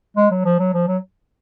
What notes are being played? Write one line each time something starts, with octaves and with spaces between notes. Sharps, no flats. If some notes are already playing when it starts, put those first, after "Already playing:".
G#3
F#3
F3
F#3
F3
F#3